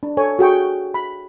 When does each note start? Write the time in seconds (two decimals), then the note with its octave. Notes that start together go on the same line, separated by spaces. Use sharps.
0.03 D4
0.17 A4 C#5 G#5
0.39 F#4 G#4 G5 C#6
0.94 B5